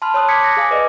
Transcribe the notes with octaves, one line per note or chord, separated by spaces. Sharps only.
A5 B5 C6 F6
C#5 A5 C6 D#6 E6 F#6
D6 D#6 G#6 B6 C#7
A#6
G#4 F5 G#5 D6 D#6
B4 D5 D#5